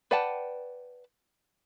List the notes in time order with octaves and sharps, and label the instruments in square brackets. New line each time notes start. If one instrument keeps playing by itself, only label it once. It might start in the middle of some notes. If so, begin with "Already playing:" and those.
[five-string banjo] B4 D5 F#5 G5 A5